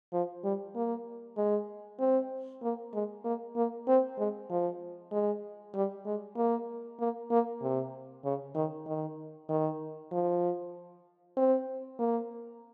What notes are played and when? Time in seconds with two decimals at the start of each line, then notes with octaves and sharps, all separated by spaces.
0.13 F3
0.44 G3
0.75 A#3
1.37 G#3
1.99 C4
2.63 A#3
2.94 G#3
3.25 A#3
3.56 A#3
3.88 C4
4.18 G#3
4.50 F3
5.12 G#3
5.75 G3
6.06 G#3
6.37 A#3
7.00 A#3
7.31 A#3
7.62 C3
8.25 C#3
8.55 D#3
8.87 D#3
9.49 D#3
10.12 F3
11.37 C4
11.99 A#3